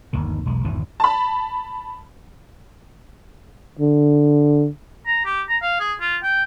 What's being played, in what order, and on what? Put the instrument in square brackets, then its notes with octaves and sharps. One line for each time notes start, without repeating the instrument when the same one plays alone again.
[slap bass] G1 D#2 D#3
E1 B1 G#3
G1 D#2 A#2 E3
[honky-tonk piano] A5 B5
[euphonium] D3
[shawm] A#5
G4
A#5
F5
G#4
F4
G5